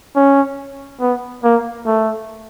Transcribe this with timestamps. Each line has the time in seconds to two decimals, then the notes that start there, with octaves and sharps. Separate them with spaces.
0.16 C#4
1.01 B3
1.44 A#3
1.86 A3